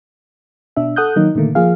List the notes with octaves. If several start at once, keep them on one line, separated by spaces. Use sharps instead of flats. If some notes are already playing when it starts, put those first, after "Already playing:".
B2 D4 E5
A4 F#5 D#6 F#6 G6
D#3 F#3 A#3 D#4
A#2 D3 D#3 A3 A#3
F3 A#3 F4 G#4 F5